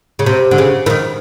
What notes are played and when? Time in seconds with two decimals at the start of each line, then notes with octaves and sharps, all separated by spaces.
0.19 C#3
0.26 C3
0.51 D3
0.58 C#3
0.86 E3
0.90 D#3